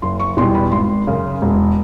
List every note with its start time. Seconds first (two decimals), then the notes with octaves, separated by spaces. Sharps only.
0.02 F#1 C6
0.20 C#6
0.37 E2 B2 G3 C6
0.55 B5
0.72 G#1 C6
1.07 F#2 C#3
1.42 E1